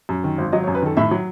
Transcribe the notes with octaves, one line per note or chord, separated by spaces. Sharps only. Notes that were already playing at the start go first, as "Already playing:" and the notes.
F#2
D#3
G#1
F#3 D#5
C#5
F#2
B4
D#3 A4
A2 E5
F#3